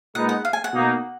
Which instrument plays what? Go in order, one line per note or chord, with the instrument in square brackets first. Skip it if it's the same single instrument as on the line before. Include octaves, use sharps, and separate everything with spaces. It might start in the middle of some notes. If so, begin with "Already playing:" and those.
[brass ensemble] A#2 G#3 B3 D#4 [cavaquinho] F#5
[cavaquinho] F#5
F5
G#5
F#5
[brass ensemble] B2 A#3 D#4